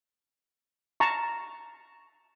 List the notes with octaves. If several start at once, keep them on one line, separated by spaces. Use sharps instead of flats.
A5 A#5 C#6